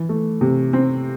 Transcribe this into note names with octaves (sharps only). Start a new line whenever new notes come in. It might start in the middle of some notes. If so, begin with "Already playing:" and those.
Already playing: E3
A3
C3
C4